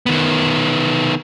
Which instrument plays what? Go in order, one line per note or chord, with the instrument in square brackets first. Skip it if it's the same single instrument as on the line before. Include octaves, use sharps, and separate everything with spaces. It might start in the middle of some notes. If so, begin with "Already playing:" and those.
[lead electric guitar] D#3 B3